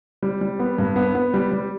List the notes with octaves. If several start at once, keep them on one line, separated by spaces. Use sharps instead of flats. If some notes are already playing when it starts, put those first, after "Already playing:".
G3
G3
B3
G2
B3
B3
G3
G3